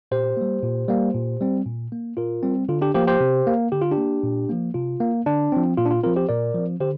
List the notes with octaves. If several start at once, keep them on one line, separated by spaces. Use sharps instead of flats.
A#2 G4 C5
G3 A#3
A#2
G3 A#3
A#2
G3 C4
A#2
A#3
A#2 F4 A#4
G3 C4
D3 F4
D4 G4
F3 A#3 G4 C5
G4 C5
C3
A#3
D3 G4
F4
D4 G4
A#3
A#2
F3 A#3
C3 F4
A#3
D3 D4
F3 C4
A#2 F4
D4
F4
F3 C4 F4 A#4
G4 C5
A#2 A#4 D5
F3 C4
D3 G4 C5